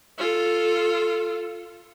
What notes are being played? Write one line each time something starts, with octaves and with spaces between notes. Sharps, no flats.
F4 A4